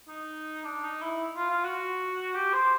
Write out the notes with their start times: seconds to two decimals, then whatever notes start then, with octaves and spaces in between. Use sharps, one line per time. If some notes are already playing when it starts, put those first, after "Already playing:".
0.08 D#4
0.64 D4
0.84 D#4
1.02 E4
1.36 F4
1.50 F4
1.64 F#4
2.35 G4
2.54 C5